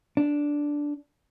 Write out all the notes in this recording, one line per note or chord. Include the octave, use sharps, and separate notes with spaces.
D4